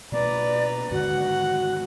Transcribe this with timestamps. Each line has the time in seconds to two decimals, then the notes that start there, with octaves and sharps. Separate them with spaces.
0.12 B2 A#3 D4 B4 D5 A#5
0.91 D#2 G#2 D3 F#4 F#5